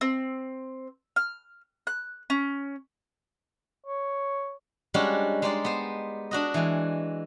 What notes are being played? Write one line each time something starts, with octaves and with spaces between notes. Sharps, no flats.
C4
F6
F#6
C#4
C#5
G3 G#3 C#4 D4 F#4 G4
G#3 D#4 G4 C5 D5
B3 C5
D4 F#4 D#5
E3 G#3